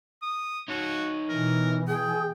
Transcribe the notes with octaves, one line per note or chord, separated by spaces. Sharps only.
D#6
D#4 F#4 C#5
B2 E3 A#4
G#4 G5